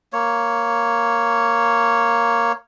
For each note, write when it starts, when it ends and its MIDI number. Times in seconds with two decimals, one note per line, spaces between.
0.13 2.52 58
0.13 2.52 73